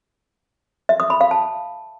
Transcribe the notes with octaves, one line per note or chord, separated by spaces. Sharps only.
E5
D#6
B5
F5
A5